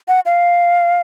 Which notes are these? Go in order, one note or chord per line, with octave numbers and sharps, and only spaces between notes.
F#5
F5